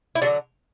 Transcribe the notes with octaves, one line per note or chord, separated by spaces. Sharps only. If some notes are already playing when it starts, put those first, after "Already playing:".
E4
D3 F#3 D4 F#4